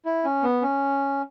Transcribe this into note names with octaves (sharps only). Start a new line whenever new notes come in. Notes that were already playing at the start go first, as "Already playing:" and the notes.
E4
C#4
B3
C#4